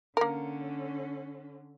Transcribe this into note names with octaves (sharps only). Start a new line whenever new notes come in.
D3 A#3 C#4 A#4